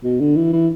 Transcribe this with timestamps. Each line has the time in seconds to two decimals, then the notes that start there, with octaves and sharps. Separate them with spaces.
0.04 B2
0.20 D3
0.36 E3
0.53 E3